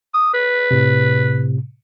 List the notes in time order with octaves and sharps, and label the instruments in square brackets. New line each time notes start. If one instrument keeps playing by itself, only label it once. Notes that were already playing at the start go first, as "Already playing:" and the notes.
[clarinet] D#6
B4
[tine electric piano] A2 C3